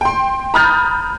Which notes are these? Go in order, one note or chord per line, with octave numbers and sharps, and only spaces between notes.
G5 C6
A#5 B5 D#6 F6 G6 A6